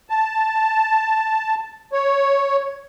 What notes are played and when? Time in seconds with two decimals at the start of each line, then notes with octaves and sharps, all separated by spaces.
0.10 A5
1.93 C#5